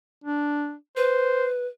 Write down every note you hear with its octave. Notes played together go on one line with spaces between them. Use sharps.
D4
B4 C5